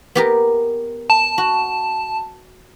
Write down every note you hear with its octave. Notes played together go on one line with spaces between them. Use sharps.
B3 G4 A#4
A5
F#4